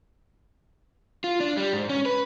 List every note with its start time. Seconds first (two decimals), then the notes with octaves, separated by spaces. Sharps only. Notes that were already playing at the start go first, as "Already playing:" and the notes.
1.24 F4
1.41 D4
1.57 G3
1.73 G#2
1.89 C#4
2.06 B4